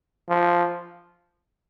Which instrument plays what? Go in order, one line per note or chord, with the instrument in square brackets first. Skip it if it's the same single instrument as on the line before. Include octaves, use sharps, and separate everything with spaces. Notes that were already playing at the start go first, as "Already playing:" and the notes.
[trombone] F3